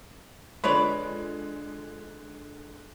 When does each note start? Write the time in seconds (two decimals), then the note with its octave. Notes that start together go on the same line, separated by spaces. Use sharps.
0.64 D3 F3 G#3 B4 C#5 D5